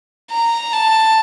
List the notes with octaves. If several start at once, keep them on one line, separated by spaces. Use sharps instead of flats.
A#5
A5